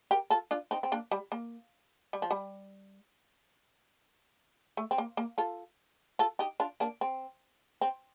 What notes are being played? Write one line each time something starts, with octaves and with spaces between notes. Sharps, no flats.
G4 A#4
F4 A4
D4 F4
C4 D#4
C4
A#3 D4
G3
A#3
G3
F3
G3
A3
C4
A#3
A#3
F4 A4
F4 A4
D#4 G4
D4 F4
A#3 D4
C4
C4